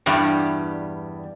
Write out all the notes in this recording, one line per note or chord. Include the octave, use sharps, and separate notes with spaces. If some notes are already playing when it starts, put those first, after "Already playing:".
E2 G2 G3